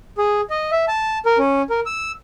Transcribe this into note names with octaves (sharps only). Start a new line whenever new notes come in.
G#4
D#5
E5
A5
A#4
C#4
A#4
E6